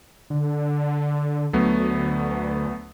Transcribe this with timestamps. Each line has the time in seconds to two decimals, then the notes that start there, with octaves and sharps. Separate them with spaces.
0.30 D3
1.53 D2 F#3 A3 B3